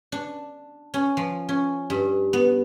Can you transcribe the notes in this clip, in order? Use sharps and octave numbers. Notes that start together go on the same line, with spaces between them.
D4
C#4
F3
C#4
G2
B3